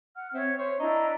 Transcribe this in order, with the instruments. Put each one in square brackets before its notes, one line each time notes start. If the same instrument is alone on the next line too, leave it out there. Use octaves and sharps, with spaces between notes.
[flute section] F#5 F6
[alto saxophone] C4 [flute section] C#5 E5
[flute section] C5 [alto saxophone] C#5
[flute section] D4 E4 A#5 [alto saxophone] D#5